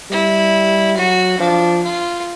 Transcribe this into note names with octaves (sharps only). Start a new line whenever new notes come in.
G3 E4
F#3 F#4
F3 D4
F4